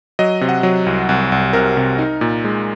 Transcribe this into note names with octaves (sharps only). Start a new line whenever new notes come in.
F#3 D#5
C3
F#5
F#3
C2
C2
C2
C3 A#4
C3
D#4
A#2
G#3